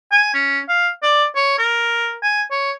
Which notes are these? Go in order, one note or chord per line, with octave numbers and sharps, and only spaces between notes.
G#5
C#4
F5
D5
C#5
A#4
G#5
C#5